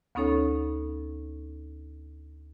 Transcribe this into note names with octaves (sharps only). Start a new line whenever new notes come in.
D2 B3 C#4 D#4 A4 C#5